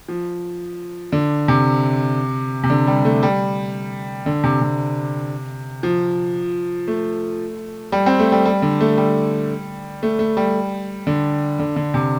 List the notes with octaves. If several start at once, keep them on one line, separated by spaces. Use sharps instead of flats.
F3
D3
C3
C3
D3
G3
A3
G3
D3
C3
C3
F3
A3
G3
C4
A3
G3
G3
D3
A3
G3
A3
A3
G3
D3
D3
D3
C3